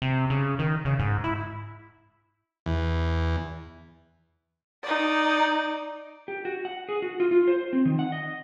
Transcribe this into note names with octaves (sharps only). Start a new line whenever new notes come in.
C3
C#3
D#3
C#3
G#2
E4
E2
D#4 D5
G4
F#4
F#5
G#4
F#4
F4
F4
C5
C4
D#3
F#5
D#5